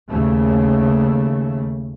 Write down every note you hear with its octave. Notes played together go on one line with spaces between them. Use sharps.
D#2 C#3 A3